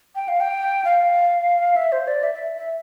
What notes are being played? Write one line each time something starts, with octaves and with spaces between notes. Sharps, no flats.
G5
F5
G5
F5
E5
C5
D5
E5
E5
E5